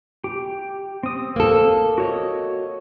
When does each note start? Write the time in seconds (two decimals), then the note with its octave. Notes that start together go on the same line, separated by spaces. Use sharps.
0.24 G4
1.03 C4 D#6
1.36 A#3 A4
1.98 F#4 C#5 D#5